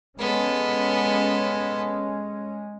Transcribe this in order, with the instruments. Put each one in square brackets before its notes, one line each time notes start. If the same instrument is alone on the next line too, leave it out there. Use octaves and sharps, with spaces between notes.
[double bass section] G#3 C#4 [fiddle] B3 A4